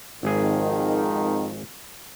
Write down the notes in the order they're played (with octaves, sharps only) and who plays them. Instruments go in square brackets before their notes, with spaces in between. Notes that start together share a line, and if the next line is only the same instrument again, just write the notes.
[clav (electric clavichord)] G#1 G#4 [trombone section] F2 G#2 D#3